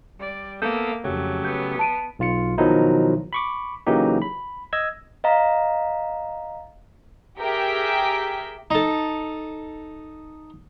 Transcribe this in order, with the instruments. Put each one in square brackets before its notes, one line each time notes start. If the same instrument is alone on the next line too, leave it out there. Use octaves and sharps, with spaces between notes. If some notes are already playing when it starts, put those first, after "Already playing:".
[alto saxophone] G3 [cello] D5
[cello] A#3 [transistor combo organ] B3 E5 D#6 [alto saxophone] A4 [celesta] G6
[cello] F2 [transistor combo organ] C#3 A3 G4 [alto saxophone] F#3
[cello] B3 [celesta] G6
[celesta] A5 D7 D#7
[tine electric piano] B1 F4 C#7
B2 D#3 F3 F#3 D#4 E4
B5 C#6 D6
C#3 E3 F#3 A#3 D#4 G4
B5
D#5 E6 G#6
[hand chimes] D#5 F5 A#5
[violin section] G4 G#4 A#4 E5 G5 B6
[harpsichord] D#4 A4